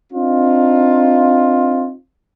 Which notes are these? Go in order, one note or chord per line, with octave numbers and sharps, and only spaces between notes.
C4 D4 D#4 F4